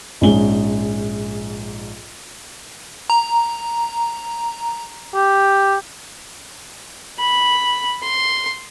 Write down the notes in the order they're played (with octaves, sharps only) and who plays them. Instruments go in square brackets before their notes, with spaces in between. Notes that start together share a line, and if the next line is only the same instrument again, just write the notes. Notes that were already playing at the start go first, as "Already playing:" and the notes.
[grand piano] A#1 G#2 C#4 G#4 G7
[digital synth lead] A#5
[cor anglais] G4
[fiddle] B5
C6